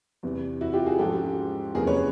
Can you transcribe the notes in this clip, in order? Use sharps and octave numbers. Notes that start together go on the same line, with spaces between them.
E2 C3 E3
E4 F#4
F4 G4
F#4 G#4
G#2 F3 G#3 C#4 G4 A4
E2 C3 F3 A#3 C#4 G#4 A#4
B4 C#5